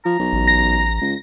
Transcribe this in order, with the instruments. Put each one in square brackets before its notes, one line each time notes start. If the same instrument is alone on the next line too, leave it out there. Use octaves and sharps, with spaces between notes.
[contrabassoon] F3 [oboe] A#5
[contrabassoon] B1
[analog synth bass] A1
[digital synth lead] A#6
[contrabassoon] C#2